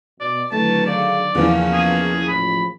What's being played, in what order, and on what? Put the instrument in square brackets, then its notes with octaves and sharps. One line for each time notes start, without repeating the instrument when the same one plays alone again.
[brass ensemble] B2 [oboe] D5
[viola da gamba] D3 D#3 F#3 [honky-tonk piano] A3 [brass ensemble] C4 E4 B4 [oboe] A5
[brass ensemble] G#4 F5 [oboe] D5
[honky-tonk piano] E2 C#3 E3 [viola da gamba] F3 A#3 C#4 [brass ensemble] F5
[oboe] G#4
[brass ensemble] A1 C#3 F3 [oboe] B5